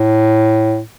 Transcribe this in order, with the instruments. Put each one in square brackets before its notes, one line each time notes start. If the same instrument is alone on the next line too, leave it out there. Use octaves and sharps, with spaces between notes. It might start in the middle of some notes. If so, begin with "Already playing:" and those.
Already playing: [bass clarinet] A2